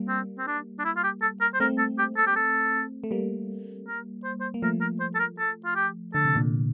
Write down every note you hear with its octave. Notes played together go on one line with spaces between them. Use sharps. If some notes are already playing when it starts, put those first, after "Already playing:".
Already playing: G3 A#3
C4
C4
D4
D4
E4
F4
G4
A4
A#4
C5
A3 C4 A#4
A4
G4
A4
G4
A4
A3
G3 A#3
A#4
C5
C5
A#3
F3 A3 A#4
A#4
C5
A4
A#4
A4
F4
G4
D3 A4
C3
A#2 D3